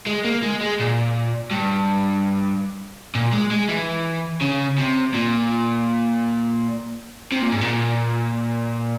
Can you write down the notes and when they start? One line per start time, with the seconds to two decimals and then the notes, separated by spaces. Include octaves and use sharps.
0.07 G#3
0.25 A#3
0.43 G#3
0.61 G#3
0.80 A#2
1.51 G2
3.15 A#2
3.33 G#3
3.51 G#3
3.69 E3
4.42 C#3
4.78 C3
5.14 A#2
7.32 C3
7.41 A#2
7.51 G#2
7.61 A#2